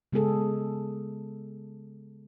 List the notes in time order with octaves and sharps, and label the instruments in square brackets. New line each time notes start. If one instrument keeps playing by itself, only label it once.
[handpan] C#3 G#3 B3 G#4 A4